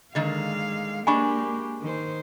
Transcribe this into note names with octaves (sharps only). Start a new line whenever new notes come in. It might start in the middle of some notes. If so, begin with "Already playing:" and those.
D3 D#3 G#3 A#3 F5
G#3 A#3 D4 G4 G#5 B5 C#6
D#3 C5